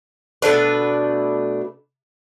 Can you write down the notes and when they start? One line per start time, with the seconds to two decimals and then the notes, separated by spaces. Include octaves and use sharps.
0.42 B2 A3 D4 B4